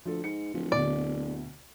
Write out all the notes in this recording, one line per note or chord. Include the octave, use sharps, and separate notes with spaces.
D2 F3 A4
G#2 C#7
D1 F3
D2 B2 D3 D5